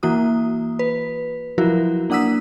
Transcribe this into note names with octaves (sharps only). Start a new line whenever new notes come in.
E3 A#3 F#4 D#6
B4
F3 F#3 E4 F#4 A#4
A#3 D4 F#5 D#6 E6 B6